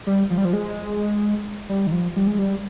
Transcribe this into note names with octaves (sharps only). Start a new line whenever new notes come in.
G3
F3
G3
F3
G#3
G3
D#3
F3
G3
G#3
G3